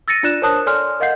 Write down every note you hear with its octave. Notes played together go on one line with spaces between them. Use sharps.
E6 A6 A#6 C#7 D#7
D4 F4 D5 F#6 E7
A#4 C5 C#5 A5 D#6 F#6
A4 C#5 D5 G#5 C6 F6
A#4 D#5 F5 F#5 G6 C7